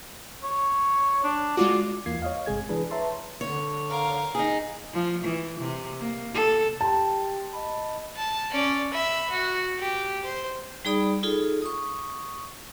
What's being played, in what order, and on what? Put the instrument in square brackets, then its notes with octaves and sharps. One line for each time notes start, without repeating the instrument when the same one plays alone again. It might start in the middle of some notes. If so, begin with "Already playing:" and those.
[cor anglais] C#5
D4
[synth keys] G#3 F4 F#4 [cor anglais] D5
[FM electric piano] E2 E3 A#3 F4 G#6 C7
C#5 D#5 F5
G1 C3 G#3 G#4 G#6
E3 D4 G#4 B4
B4 C#5 E5 A5 A#5 C6
[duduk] D3 [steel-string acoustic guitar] C#5
[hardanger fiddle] A#4 F5
[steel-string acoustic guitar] D#4 G#4
[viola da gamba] F3
E3
C3
A#3
A4
[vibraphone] G4 G5 C6 [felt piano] A5
[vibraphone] D#5 B5
[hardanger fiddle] A5
C#4 D5
E5 B5
F#4
G4
C5
[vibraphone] G3 D#4 G#4 D5 B5 D#6
D#4 F4 G#4 A4
C#6 D#6